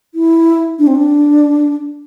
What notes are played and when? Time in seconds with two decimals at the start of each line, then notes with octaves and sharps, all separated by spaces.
0.14 E4
0.79 D4
0.87 C4
0.95 D4